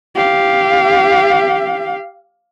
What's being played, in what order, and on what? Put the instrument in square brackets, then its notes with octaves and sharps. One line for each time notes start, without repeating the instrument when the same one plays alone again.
[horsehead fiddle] G4 F5